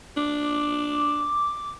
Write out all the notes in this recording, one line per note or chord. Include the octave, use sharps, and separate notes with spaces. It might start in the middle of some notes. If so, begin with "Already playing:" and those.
D4 D6